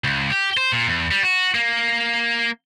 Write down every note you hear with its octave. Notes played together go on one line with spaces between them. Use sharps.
C#2
G4
C5
A#2
E2
G3
F#4
A#3